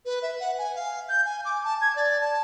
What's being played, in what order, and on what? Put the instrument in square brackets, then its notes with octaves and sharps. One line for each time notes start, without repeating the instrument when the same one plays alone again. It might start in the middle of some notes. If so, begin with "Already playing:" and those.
[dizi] B4
E5
F#5
G#5
F5
G6
G#5
D6
A5
G#6
D5
A5